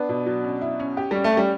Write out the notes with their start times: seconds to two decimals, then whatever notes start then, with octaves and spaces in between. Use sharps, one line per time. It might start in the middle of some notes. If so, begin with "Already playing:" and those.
Already playing: B3 D4
0.09 B2
0.26 F#3
0.44 C#4
0.62 E4
0.80 C#4
0.97 G4
1.11 G3 C#4
1.24 A3
1.32 C#4
1.37 G3